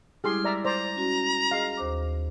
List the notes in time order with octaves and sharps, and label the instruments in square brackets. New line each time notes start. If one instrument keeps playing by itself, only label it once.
[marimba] G3 G#3 E4 [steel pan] G4 G#4 C6 [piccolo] F6
[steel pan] D5 E5 A#5
[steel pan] C5 D5 [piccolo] A#5
[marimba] C#4 F#4
[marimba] G#4 D#5 [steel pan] F5
[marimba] D#2 C5 D6